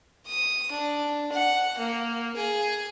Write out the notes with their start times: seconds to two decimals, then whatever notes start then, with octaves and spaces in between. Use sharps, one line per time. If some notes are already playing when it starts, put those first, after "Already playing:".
0.27 D#6
0.71 D4
1.32 F#5
1.78 A#3
2.36 G#4